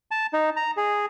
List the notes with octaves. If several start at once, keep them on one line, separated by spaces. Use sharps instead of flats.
A5
D#4
A#5
G#4